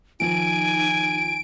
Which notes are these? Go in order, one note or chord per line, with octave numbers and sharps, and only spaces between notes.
D#3 F3 D#4 G#5 D7